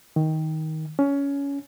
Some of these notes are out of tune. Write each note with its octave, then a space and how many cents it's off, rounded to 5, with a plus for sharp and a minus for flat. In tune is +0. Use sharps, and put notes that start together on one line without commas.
D#3 +15
C#4 +20